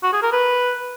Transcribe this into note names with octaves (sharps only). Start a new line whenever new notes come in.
F#4
G#4
A#4
B4